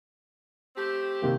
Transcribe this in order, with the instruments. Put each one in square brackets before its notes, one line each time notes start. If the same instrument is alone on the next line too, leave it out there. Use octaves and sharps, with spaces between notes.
[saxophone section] A3 C4 G4
[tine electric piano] C3 D#3 A#3